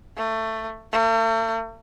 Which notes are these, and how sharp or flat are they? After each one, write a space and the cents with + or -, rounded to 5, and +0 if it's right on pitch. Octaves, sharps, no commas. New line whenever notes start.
A3 +15
A3 +45